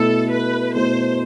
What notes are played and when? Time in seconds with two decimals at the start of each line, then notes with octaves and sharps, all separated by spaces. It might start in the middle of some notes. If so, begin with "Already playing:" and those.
Already playing: B2 A3 E4 A4
0.31 B4
0.75 B2 A3 E4 C5